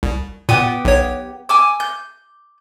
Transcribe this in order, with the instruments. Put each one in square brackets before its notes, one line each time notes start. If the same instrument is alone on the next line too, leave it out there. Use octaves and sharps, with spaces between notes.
[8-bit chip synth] C2
[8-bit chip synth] A#2 [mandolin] B3 G4 D#6
[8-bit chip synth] B1 C#5
[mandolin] G#5 D6 E6
G6